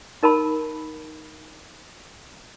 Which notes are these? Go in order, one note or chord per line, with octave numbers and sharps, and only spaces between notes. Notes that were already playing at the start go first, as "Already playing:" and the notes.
D#4 A#4 A5 B5